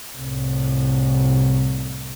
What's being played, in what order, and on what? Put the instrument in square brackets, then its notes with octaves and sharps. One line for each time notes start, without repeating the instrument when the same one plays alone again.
[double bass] C2 A2